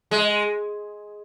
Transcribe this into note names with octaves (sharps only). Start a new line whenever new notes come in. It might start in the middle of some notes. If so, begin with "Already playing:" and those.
G#3